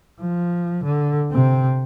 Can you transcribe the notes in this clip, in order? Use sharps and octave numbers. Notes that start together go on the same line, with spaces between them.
F3
D3
C3 C4